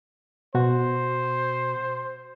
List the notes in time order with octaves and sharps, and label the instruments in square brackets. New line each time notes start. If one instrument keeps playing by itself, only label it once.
[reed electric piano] B2 F#4 [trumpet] C5